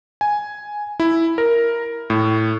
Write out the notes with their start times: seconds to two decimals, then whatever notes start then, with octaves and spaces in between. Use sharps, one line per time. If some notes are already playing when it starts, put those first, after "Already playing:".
0.21 G#5
1.00 E4
1.38 A#4
2.10 A2